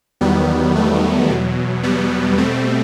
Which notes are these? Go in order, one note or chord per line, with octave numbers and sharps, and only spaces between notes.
E2 D#3 F#3 G3 B3
A3
E2 B2 F#3
G3 B3
B2 G3 A3 C4